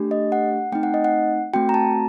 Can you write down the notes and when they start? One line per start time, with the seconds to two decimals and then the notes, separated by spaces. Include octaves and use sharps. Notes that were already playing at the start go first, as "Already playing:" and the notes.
Already playing: A3 D4 G4
0.11 D#5
0.32 F#5
0.72 A3 C4 D#4 G5
0.83 F#5
0.94 D#5
1.04 F#5
1.53 A3 C4 F#4 G5
1.69 A#5
1.74 A5